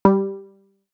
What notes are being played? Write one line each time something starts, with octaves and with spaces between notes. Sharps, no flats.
G3